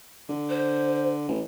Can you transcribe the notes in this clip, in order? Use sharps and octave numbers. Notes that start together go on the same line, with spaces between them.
D3
C5
A1